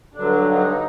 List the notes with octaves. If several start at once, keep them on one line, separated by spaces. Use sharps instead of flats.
G2 D3 F#3 D4
D#4